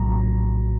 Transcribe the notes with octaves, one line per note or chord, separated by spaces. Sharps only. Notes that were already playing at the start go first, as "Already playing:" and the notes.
Already playing: A#1 A2 F#3 A#5